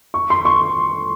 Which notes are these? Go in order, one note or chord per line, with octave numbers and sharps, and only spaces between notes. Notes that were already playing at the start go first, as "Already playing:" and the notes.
C#6
C6
C#6